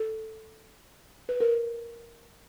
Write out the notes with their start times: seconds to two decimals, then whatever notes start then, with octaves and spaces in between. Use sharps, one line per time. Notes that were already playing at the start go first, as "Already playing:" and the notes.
Already playing: A4
1.29 B4
1.40 A#4